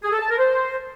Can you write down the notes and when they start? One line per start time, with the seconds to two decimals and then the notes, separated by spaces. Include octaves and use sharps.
0.03 G#4
0.12 A4
0.21 A5
0.30 A#4
0.38 C5